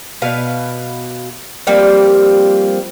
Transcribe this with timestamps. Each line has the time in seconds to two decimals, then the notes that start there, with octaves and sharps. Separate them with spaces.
0.22 B2 B4 F5
1.67 F3 G3 A#3 C4